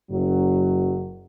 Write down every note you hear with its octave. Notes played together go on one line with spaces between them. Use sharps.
F#1 F#2 F#3